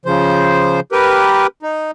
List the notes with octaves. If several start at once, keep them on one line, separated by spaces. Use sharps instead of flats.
C#3 F3 C5
G4 A#4 B4
D#4